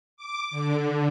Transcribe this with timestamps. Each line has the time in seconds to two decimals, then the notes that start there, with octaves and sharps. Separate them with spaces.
0.17 D6
0.51 D3